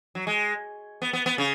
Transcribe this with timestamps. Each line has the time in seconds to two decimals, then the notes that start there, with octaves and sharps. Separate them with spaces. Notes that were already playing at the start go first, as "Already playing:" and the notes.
0.15 F#3
0.27 G#3
1.02 B3
1.13 B3
1.26 B3
1.38 C#3